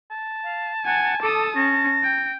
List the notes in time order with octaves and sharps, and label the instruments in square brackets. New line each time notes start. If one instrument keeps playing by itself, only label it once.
[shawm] A5
[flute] F5
[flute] F#5 [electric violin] G#5
[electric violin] A4 D#6 [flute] D6
[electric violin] C#4 [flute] A#6
[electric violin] G5